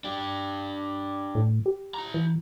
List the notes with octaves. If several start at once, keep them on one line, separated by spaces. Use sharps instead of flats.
D4 G4
A2
G4
E4 A#5
E3